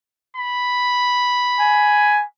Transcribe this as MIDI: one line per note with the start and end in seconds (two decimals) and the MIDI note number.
0.37 2.25 83
1.59 2.24 80